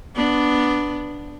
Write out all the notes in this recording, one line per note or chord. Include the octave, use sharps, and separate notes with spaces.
B3 D4